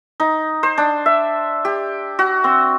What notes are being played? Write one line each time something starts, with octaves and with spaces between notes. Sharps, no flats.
D#4
C5
D4
E5
G4
F#4
C4